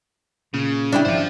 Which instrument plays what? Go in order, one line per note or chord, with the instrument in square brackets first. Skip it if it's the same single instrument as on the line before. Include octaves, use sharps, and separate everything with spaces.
[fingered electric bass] A#2 [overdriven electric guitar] C#3
[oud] D4 E4 G4
[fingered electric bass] G#1 C#3 F3 [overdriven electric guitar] C5 F5